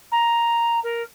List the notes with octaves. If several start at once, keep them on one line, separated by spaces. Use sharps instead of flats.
A#5
A#4